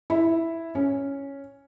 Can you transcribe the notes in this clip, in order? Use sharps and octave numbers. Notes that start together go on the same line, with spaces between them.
E4
C#4